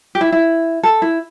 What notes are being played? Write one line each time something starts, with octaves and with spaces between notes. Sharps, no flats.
G4
E4
E4
A4
E4